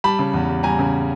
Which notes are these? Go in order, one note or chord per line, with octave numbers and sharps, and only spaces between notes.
G3 A5 B5
C#3
E2
G3
G3 G#5 A#5
C#3